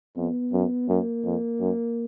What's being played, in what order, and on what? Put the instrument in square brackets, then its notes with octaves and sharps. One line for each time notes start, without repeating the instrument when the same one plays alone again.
[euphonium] F2 [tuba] B3
[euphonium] F#2
[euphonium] F#2 [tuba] A#3
[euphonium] F2
F#2